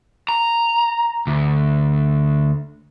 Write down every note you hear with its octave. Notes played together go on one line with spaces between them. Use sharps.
A#5
D2